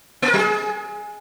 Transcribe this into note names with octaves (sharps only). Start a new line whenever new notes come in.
A#3
A#4
F#3
G#4